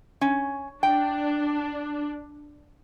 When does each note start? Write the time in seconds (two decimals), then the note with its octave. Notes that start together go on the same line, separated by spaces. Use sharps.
0.21 C#4
0.83 D4 G5